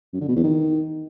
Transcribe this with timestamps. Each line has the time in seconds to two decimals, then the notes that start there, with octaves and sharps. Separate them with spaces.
0.13 F#2
0.21 D3
0.28 B2
0.36 E2
0.44 D#3